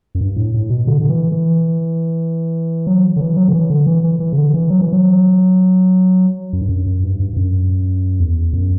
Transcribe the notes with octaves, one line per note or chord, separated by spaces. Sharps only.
F#2
G2
A2
A2
B2
D3
D3
E3
E3
F#3
D3
E3
F#3
D3
E3
D3
E3
E3
E3
C#3
D3
E3
F#3
E3
F#3
F#2
G2
F#2
F#2
G2
G2
G2
F#2
E2
F#2